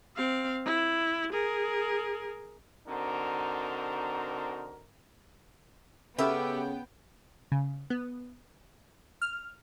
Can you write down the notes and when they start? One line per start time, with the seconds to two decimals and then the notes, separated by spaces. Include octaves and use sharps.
0.17 C4 F5
0.65 E4
1.33 G#4 A#4
2.87 D3 C4 D4 D#4 F#4 A#4
6.19 C#3 B3 C#4 G4 A4 E5 G5 B5
7.52 C#3
7.90 B3
9.22 F6